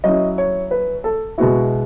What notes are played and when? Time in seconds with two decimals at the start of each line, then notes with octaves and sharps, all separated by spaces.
0.04 F#3 C#4 E4 D#5
0.38 C#5
0.71 B4
1.04 A4
1.38 B2 G#3 B3 E4 F#4